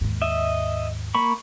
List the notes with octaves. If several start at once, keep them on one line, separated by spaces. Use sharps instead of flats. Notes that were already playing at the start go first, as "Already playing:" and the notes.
D#2 G#2
D#5 E5
A#3 B5 C#6